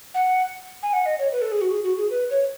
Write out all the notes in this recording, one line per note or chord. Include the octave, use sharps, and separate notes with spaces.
F#5
G#5
F#5
D#5
C#5
B4
A4
G#4
F#4
G#4
F#4
G#4
B4
C#5